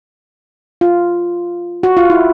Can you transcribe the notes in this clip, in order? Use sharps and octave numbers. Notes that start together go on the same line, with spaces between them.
F4
F#4
F4
E4